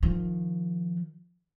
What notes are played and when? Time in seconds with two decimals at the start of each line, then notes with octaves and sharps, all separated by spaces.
0.03 D#3 F3